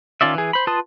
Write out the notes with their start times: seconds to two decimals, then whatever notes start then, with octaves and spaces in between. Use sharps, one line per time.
0.21 D#3 C#4 F4 D5 E5
0.35 E3 G#4
0.53 C5 B5
0.67 F4 B4 A5 C6 D#6